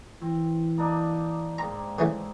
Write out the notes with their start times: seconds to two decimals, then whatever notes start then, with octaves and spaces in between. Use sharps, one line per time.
0.22 E3 C4
0.78 A#3 D4 D#4
1.58 G#2 A#3 C4 A#5
1.99 C#3 E3 A3